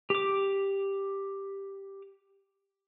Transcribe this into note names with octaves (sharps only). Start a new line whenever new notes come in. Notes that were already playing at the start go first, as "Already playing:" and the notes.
G4 D6